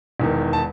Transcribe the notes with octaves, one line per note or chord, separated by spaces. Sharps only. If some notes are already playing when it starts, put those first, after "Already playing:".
E1 E2 D#3
A5